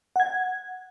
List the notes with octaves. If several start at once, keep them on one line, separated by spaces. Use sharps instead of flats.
F#5 G#6